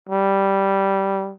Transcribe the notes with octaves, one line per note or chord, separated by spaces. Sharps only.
G3